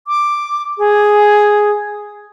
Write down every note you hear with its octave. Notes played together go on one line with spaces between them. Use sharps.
D6
G#4